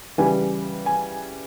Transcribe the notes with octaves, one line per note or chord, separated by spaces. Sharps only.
C#3 E3 G3 G#5
G#5